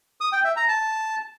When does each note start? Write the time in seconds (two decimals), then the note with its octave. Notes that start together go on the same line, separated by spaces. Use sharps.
0.21 D#6
0.33 G5
0.45 E5
0.56 A#5
0.68 A5